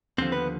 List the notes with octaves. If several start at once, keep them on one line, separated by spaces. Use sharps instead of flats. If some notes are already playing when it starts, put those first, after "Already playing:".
D#2 D3 F3 C4 C5
B3 B4